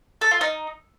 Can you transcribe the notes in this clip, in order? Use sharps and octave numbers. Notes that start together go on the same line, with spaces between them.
A4
F4
D#4